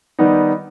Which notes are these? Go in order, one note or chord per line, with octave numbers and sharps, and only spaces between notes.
D#3 G3 B3 D#4